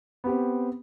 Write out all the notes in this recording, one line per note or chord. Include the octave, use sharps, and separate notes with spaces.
B3 C4 G4